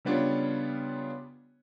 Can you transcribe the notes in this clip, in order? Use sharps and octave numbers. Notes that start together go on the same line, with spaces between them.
C#3 G3 B3 D4 F4 C#5